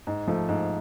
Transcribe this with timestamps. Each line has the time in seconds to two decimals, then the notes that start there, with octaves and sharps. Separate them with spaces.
0.07 G#2
0.28 F3 A3
0.49 G#2